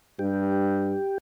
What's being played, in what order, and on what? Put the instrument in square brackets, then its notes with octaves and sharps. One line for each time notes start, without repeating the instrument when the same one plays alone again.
[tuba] G2 [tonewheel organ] G4